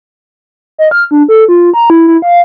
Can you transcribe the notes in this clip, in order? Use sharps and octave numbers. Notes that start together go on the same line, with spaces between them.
D#5
F6
D4
A4
F4
A#5
E4
E4
F5